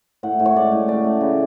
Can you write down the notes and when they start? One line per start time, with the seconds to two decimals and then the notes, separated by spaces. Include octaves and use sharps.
0.23 A2 F#5
0.39 A2
0.45 C#5
0.55 G#3 D5
0.71 A2
0.88 C#3 D5
1.04 A3
1.21 C#3